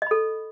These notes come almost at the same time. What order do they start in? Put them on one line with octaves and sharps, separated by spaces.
D#5 B5 A4